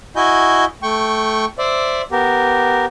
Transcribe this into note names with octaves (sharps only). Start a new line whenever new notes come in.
E4 F#4 D#5 G#5 G6
A3 G5 C#6
C5 D5 E5
B3 G4 A#4